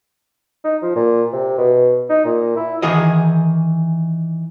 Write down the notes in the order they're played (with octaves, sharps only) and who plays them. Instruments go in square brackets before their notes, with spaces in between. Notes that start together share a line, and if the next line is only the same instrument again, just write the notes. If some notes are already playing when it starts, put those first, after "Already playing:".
[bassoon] D#4
F3
A#2
C3
B2
D#4
A#2
E4
[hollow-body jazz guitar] D#3 E3 G#4 D#5